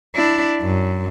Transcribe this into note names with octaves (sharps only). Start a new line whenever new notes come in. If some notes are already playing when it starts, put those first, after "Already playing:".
D4 E4
F#2